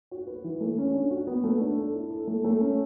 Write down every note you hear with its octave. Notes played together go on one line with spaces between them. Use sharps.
F#4
B4
E3
A3
C#4
D4
F#4
B3
A3
D4
A4
E4
A4
A3
A3
C#4